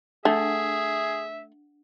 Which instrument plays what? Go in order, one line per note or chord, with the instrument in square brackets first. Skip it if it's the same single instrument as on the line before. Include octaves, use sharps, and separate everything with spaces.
[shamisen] A3 [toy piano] D4 F#5 [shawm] G#4 [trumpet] E5